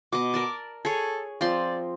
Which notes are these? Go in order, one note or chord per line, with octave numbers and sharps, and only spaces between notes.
B2 D#5 D6
A#4 D5 A5
G#4 A4 C#5
F3 C4 D5 C6